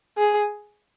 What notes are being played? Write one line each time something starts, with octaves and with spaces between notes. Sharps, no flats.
G#4